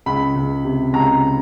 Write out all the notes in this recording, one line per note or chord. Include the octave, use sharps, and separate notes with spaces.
C#2 B5
C#2
C3
C#2 A#5